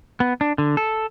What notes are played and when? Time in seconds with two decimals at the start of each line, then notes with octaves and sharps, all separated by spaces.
0.20 B3
0.41 D4
0.58 D3
0.77 A4